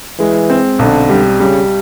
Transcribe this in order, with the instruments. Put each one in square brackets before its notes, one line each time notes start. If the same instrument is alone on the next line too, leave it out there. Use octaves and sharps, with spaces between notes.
[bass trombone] E3 [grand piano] G#3
[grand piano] C4
[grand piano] B1 [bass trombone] D3
[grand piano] G3
[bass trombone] C#3 [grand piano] G3